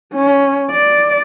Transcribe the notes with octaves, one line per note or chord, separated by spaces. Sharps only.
C#4
D5